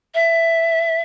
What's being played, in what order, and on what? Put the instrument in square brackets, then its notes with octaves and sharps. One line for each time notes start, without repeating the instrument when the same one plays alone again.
[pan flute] E5